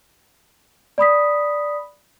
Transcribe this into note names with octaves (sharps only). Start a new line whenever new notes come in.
D5 B5 D#6 B6